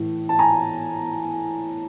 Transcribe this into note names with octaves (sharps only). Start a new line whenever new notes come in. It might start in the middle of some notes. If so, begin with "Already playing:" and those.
Already playing: A2 E3
A5
G#5 A#5